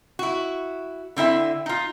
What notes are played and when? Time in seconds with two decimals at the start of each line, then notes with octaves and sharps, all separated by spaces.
0.19 E4 F#4
1.16 D3 C4 E4 E5
1.66 D#4 F4